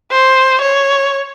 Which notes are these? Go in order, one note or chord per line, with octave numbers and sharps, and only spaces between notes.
C5
C#5